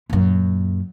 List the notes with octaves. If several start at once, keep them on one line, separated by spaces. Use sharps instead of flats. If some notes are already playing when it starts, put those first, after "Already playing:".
F#2 A#2